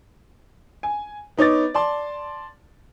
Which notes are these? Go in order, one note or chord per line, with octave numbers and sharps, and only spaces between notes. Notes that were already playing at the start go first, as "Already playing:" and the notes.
G#5
B3 D#4 C#5 D6 A6
D5 A5 C6